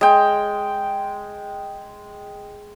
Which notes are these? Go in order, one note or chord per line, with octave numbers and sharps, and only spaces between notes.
G#3 G5